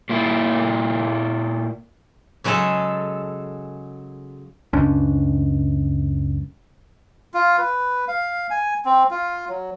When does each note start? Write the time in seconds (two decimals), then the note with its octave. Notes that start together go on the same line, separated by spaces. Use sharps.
0.09 A#2 A#3 E4
2.44 C#3 F#3 G#3 G#4 A4
4.73 F#1 C#2 C#4 D4
7.34 F4
7.58 B4
8.08 F5
8.50 G#5
8.85 C4
9.11 F4
9.49 F#3